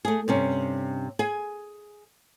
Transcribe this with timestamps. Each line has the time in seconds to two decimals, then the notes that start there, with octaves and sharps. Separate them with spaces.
0.05 A3 G#4
0.28 G2 C3 C#4
1.19 G#4 G#5